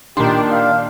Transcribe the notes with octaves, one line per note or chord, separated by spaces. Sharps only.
A#2 D#3 D4 G4 C6
F5